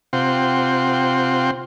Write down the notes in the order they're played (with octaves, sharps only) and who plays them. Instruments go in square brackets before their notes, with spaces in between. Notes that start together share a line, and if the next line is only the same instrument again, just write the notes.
[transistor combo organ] C3 C4 F4 F#5 G5 C6